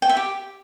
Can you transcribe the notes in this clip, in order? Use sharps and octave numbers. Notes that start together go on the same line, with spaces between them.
G5
E5
G4